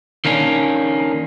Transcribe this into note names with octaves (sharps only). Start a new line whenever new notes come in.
D#3 A#3 C#4 D4